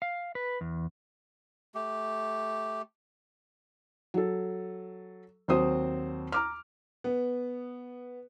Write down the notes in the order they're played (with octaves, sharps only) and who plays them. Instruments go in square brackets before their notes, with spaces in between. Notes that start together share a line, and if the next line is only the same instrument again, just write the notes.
[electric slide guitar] F5
B4
E2
[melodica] A3 G4
[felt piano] F#3 A4
D#2 F#3 C4 C5 D#6
A#5 D6 F6
[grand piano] B3